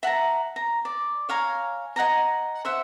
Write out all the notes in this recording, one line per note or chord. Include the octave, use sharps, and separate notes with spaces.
E5 F#5 A5 A#5
A#5
D5
C#5 F5 G#5 A#5
D#5 F#5 G#5 A#5
C5 E5 F#5